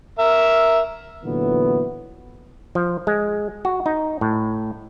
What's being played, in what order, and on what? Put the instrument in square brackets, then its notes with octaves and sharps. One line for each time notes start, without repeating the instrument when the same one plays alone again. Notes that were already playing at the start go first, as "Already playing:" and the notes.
[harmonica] A#4 E5
[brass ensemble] A#2 D3 E3 F#3 B3
[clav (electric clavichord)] F3
G#3
F#4
D#4
A2